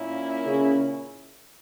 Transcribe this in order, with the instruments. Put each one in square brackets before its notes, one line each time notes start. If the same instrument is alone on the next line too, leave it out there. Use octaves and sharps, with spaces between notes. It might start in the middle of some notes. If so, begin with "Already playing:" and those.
Already playing: [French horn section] A#2 A#3 C#4 E4
[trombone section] C#3